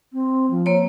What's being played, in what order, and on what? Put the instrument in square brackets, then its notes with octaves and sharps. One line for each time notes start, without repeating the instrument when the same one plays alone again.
[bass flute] C4
F3
[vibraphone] A#3 C#5